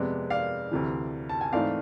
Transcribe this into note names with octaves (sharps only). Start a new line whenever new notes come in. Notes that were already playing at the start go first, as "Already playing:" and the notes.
Already playing: F2 C3 G#3 B3 D5
D5 F5
D2 C3 E3
A5
G#5
G#2 E3 A3 C4 D5 F5